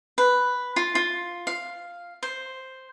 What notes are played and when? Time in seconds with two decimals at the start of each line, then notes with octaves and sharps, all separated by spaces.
0.18 B4
0.76 F4
0.95 F4
1.47 F5
2.23 C5